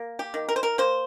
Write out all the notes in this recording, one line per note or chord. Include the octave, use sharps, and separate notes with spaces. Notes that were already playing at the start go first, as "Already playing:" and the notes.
Already playing: A#3
G4
D#3
A#4
C5
A#4
A#3 C5